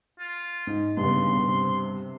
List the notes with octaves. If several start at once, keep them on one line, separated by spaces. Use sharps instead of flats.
F4
G#2
G2 C#3 B3 C6
C3